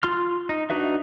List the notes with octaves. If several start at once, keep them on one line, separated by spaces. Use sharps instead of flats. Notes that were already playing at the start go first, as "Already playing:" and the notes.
F4 C6 F6
D#4
D4 D#4 F#4 B4 E5